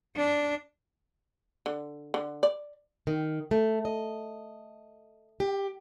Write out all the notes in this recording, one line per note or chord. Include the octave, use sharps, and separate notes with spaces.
D4
D3
D3
D5
D#3
A3
D#5
G4